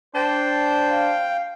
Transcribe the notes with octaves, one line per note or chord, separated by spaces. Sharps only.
D4 C5 G5
F5